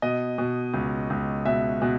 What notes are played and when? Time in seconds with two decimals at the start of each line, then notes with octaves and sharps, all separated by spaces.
0.02 B2 D#5
0.38 B2
0.74 C#2
1.10 C#2
1.45 B2 E5
1.82 B2